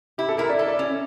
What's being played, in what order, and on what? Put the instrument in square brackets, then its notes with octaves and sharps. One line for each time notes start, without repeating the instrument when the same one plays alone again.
[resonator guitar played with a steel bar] E4 [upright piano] G4
[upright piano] A4
[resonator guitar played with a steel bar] E4 [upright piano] A#4
[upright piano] D5
[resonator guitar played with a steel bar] A4 [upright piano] E5
[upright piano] D5
[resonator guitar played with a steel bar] C#4